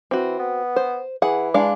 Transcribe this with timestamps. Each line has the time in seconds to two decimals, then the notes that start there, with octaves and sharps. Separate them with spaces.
0.11 E3 C4 F#4
0.39 B3
0.76 C5
1.22 E3 G#4 F#5
1.54 G#3 D4 F5